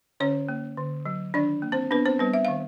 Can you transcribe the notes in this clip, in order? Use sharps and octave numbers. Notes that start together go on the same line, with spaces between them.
D3 C#4 C#5
A#3
D3
F#3
D#3 D4 D5
A#3
C4 C5
B3 D4 B4
C4 C5
G3 B3 B4
E5
D#3 F5